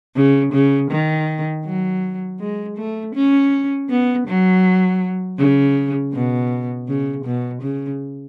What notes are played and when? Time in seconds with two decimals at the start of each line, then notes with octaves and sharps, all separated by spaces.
0.16 C#3
0.53 C#3
0.91 D#3
1.65 F#3
2.40 G#3
2.77 A3
3.15 C#4
3.89 B3
4.27 F#3
5.38 C#3
6.13 B2
6.88 C#3
7.25 B2
7.62 C#3